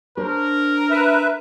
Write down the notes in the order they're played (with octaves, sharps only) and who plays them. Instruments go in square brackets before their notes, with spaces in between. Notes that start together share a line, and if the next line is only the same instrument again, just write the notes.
[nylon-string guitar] D4 C5 C#5 [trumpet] A#4
[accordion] B4 E5